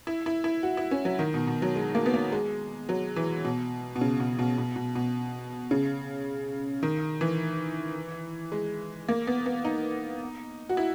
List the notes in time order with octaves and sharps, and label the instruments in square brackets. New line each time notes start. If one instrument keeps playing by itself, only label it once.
[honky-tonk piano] E4
E4
E4
F#4
E4
C#4
F#3
D#3
B2
B2
F#3
G#3
A#3
B3
A#3
G#3
F#3
E3
B2
B2
C#3
B2
B2
B2
B2
B2
C#3
D#3
E3
G#3
A#3
B3
B3
D#4
F#4
E4